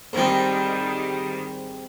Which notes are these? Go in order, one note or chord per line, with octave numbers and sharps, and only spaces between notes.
G#2 D#3 G3 C4